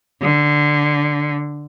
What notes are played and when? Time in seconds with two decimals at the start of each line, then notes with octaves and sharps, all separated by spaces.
0.22 D3